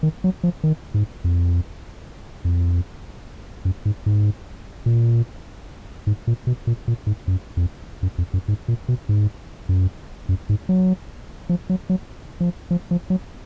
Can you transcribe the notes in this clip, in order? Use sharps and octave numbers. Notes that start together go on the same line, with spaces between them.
D#3
F#3
F3
D#3
G#2
F2
F2
F#2
G#2
G#2
A#2
G#2
A#2
B2
A#2
A#2
G#2
F#2
F2
F#2
F2
F#2
G#2
A#2
B2
G#2
F#2
F#2
G#2
F#3
F3
F#3
F#3
F3
F3
F3
F#3